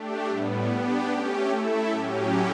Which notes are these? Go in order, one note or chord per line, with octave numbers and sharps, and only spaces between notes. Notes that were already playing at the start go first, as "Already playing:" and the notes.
Already playing: A3 D4 G4
A2 G3 B3
B3 D4 G4
A3 C#4 G4
A3 E4 A4 E5
A2 F#3 C#4 G4